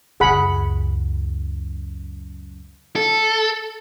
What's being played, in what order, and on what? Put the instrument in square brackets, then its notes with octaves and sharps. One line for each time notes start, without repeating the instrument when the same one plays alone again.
[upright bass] C#2 F#2 [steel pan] G#4 F#5 B5
[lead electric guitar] A4